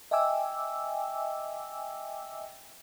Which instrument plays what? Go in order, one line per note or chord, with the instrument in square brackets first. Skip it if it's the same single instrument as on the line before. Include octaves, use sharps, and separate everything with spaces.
[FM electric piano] D#5 E5 G5 G#5 D6 E6